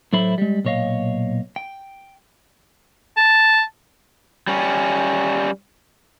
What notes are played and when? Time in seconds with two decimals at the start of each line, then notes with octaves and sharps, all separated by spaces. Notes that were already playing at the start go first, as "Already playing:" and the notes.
0.13 A2 F#3 A3 E4 C5 B5
0.38 G3 G#3
0.65 B1 A#2 C#5 D#5 F5
1.56 G5
3.17 A5
4.48 G3 C#4